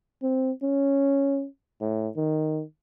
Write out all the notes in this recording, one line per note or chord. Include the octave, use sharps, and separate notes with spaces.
C4
C#4
A2
D#3